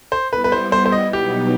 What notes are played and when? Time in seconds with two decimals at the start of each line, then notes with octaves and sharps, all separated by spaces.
0.12 C5
0.32 G3 B3 E4 B4
0.44 B4
0.52 C5
0.72 C5
0.86 C5
0.92 D#5
1.13 B2 F#3 B3 D#4 G4